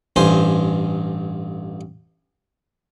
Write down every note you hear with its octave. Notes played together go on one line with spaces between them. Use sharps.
A1 G2 C5 G#5